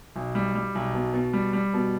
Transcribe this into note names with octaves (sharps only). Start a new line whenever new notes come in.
B1
G3
G3
B1
B2
B2
G3
G3
B2